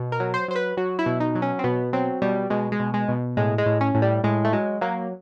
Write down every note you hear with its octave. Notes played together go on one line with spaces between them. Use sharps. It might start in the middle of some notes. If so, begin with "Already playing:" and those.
Already playing: B2
A#4
F#3
C5
F#3 C5
B4
F#3 F#4
E4
B2
D#4
F#3
C#4
C4
B2 B3
F#3 C4
B2 G3
B2 G#3
G#3
B2
G#3
B2
A2 G#3
G#3
A2
C#4
A2
G3
A2 G#3
A3
F#3 G#3
F#3 A#3